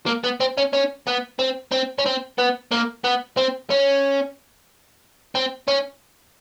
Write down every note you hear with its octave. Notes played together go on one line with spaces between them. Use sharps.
A#3
B3
C4
C#4
C#4
B3
C4
C4
C#4
C4
B3
A#3
B3
C4
C#4
C4
C#4